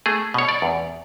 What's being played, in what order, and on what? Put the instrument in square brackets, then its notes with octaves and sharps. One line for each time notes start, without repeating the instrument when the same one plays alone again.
[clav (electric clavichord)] A3 G#4
B2 C#5
D5
E2